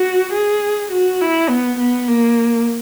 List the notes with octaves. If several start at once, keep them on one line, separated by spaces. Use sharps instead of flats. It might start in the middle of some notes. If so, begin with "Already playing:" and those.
Already playing: F#4
G#4
F#4
E4
B3
B3
A#3